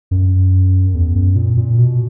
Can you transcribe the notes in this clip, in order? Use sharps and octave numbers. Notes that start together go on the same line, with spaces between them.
F#2
E2
F#2
A#2
A#2
B2